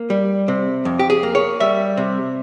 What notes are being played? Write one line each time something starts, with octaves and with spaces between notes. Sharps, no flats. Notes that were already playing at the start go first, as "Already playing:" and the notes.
Already playing: A#3
G3
C3
F2
G4
G#4
A#3
C#5
G3 E5
C3